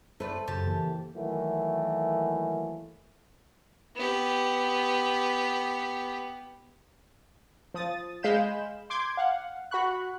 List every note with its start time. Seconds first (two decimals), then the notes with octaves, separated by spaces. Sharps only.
0.20 A3 A4 B4 C5 D5
0.48 F#2 C#3 G4 A5
0.67 E3 A#3
1.16 D#3 E3 F#3 A3 A#3
3.96 B3 G4
7.74 F3 D#6 A6
8.23 G#3 F5 B5 G6 E7
8.90 C6 D6 G6 G#6
9.17 F5 F#5
9.71 F#4 B5 C#6 F#6